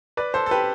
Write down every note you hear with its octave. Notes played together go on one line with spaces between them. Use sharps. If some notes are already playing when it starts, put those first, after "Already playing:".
B4 D5
A4 C5
A4
G4 B4